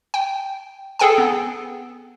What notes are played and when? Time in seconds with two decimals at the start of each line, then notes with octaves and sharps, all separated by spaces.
0.14 G5
0.99 G#4 A4 G5 G#5
1.18 B3